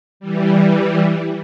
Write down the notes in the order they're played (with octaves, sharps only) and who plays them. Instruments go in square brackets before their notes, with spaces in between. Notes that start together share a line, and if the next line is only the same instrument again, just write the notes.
[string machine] E3 G3